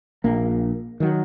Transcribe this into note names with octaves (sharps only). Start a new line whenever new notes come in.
A#1 A#3
D#3 F#3